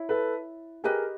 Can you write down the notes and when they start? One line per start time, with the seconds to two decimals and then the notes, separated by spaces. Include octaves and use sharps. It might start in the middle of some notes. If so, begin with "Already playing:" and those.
Already playing: E4 C#5
0.09 A4 B4
0.84 G4 G#4 A#4 B4 D#5